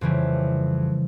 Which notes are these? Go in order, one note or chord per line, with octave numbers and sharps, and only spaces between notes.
F2 C#3 E3 G3